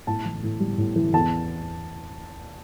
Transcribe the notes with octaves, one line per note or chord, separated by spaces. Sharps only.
A2 A5
E3
A2
G3
A2
E3
E2 A5